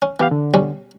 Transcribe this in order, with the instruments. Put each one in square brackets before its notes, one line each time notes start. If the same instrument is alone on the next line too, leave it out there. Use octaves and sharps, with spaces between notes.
[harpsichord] C#4
[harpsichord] E3 [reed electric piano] B3 G4 F5
[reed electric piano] D3
[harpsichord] B1 G3 C#4